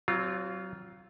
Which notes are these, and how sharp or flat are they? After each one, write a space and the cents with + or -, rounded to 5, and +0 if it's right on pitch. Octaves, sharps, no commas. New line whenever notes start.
F#3 +35 C4 +0 F4 +0